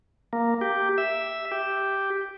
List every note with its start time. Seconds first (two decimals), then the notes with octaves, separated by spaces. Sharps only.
0.33 A#3
0.61 G4
0.98 E5
1.52 G4